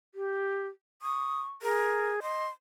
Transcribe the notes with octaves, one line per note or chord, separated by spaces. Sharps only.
G4
C#6 D#6
G#4 A#4
D#5 C6